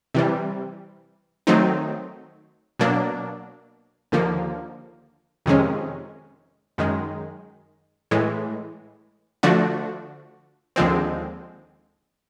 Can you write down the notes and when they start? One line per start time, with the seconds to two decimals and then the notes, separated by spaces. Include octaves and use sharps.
0.14 C3 E3 G3
1.47 D#3 F#3 A3 C4 D#4
2.79 B2 F#3 A#3 D4
4.12 D#2 D3 F3 A#3
5.46 F2 C3 D#3 G#3 C#4
6.78 F#2 D#3 G#3
8.11 A2 E3 G#3
9.43 D3 F3 A3 D4 F#4
10.76 D#2 D3 F3 G#3 C4